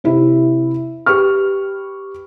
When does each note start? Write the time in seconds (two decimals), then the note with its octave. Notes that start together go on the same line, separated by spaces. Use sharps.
0.04 C3 E4 G4
1.06 G4 B4 C#6 F6